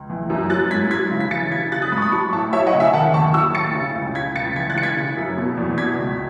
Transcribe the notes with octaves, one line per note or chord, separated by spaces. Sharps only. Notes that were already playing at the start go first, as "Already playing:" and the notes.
Already playing: C#2
E3
F#2
F#3 F#6 A6
G#2 G#6 B6
F#3 G#6 B6
C#3
B6
E3 A6 C#7
C#3 G#6 B6
F#3 F#6 A6
D#6 F#6
G#2 B5 D#6
C#6
B5 D#6
F#3 A5 C#6
A2 A5 C#6
F#3 C#5 E5
D#5 F#5
C#3
E5 G#5
D#3 F#5 A5
D#2 A5 C#6
F#3 C#6 E6
A2 A6 C#7
C#3
C#2
C#3 G#6 B6
C#2 A6 C#7
E3 G#6 B6
F#6 A6
C#3 C#7
G#6 B6
C#3
F#2
B2
E2
B2 G#6 B6
C#2